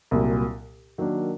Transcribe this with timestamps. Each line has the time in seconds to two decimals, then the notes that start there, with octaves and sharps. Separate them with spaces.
0.11 C2 A#2 F#3
0.98 D#3 F#3 A#3 D4